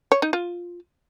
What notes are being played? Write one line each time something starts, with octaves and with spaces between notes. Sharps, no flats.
C#5
D#4
F4